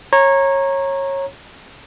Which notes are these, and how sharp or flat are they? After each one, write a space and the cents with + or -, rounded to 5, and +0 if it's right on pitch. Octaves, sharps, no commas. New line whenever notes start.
C#5 -20 A#5 +0